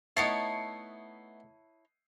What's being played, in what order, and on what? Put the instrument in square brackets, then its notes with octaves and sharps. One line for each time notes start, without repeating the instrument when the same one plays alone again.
[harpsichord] A3 B3 D#4 [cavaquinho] E4 C#5 A5 [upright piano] C7 C#7